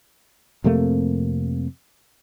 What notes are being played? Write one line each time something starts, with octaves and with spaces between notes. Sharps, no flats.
F2 C3 A3 A#3